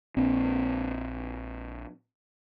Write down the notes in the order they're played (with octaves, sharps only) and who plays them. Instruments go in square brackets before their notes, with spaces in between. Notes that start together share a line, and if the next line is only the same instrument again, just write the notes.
[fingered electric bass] A#1 C4